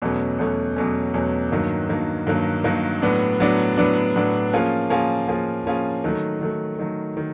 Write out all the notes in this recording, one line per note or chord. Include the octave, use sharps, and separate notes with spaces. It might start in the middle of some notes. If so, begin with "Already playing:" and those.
E2 B2 F#3 A3 C#4
E2 B2 F#3 A3 C#4
E2 B2 F#3 A3 C#4
E2 B2 F#3 A3 C#4
G2 D#3 F#3 A#3
G2 D#3 F#3 A#3
G2 D#3 F#3 A#3
G2 D#3 F#3 A#3
A2 F#3 B3 D4
A2 F#3 B3 D4
A2 F#3 B3 D4
A2 F#3 B3 D4
F3 A#3 C#4 F4 G#4
F3 A#3 C#4 F4 G#4
F3 A#3 C#4 F4 G#4
F3 A#3 C#4 F4 G#4
D#3 F#3 A3
D#3 F#3 A3
D#3 F#3 A3
D#3